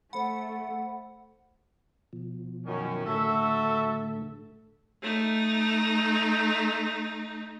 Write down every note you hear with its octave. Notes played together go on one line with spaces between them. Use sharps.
A3 C5 F#5 B5
B2 F3
F#2 D#3 C#4
A2 D3 A3 F#4 A4 E5
A3 D#4